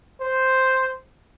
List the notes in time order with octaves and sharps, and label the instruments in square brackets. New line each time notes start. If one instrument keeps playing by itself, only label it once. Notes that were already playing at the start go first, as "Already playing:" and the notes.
[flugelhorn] C5